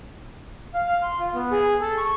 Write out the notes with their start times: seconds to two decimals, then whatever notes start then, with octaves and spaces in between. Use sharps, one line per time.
0.74 F5
0.89 F5
1.03 C6
1.19 F4
1.34 B3
1.52 G#4
1.81 A4
1.98 C#6